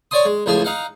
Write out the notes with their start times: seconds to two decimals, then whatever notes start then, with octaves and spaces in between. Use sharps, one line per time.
0.11 C#5 D5 G#5 C6 D#6
0.25 G#3
0.46 C#2 A2 F3 G#4 G#5
0.65 D#4 F5 F#5